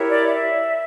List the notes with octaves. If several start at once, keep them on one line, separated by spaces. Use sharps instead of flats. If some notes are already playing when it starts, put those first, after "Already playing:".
Already playing: E4 G4 A#4 C#5
D5
E5